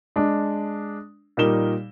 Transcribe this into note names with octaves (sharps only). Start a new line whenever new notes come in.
G#3 D4
A#2 G3 D#4 A#4 E7 G7